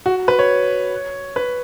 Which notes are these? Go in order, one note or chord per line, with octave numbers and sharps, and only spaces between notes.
F#4
B4
C#5
B4